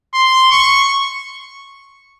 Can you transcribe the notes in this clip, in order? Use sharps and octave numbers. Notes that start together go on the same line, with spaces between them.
C6
C#6